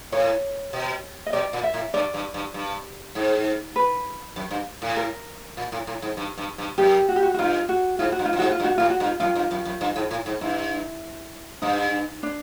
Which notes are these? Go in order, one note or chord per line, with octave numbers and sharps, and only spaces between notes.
A2 C#5
B2
D#5
B2 D5
A#2
E5
A2
G2 D5
G2
G2
G2
G#2
B4
F#2
G2
A2
A#4
A#2
A2
A2
G#2
G2
G2
G2
F#2 G4
F#4
G4
F#4
F#4
G2 F4
F#4
G#2 F4
F#4
G2
F4
G2
G#2 F#4
F4
G2
F#4
A2 F4
F#4
G2
F4
F#2 F4
G2
F#2
F#2
G2
G#2
A2
G#2
G2 E4
G2 D#4
D4